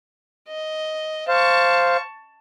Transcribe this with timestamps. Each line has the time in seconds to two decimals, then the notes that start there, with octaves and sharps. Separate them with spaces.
0.49 D#5
1.28 C5 F5 A5 C#6